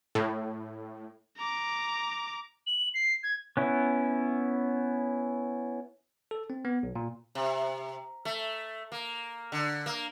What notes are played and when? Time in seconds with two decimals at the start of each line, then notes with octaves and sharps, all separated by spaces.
0.15 A2
1.38 A#5 D6
2.67 F#7
2.94 C7
3.23 G#6
3.57 B3 C#4 E4
6.31 A4
6.50 C4
6.65 B3
6.83 B1
6.96 A#2
7.35 C3
8.25 A3
8.92 A#3
9.52 D3
9.86 A#3